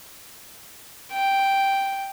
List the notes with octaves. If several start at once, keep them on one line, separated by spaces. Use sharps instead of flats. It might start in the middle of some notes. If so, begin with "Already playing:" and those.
G5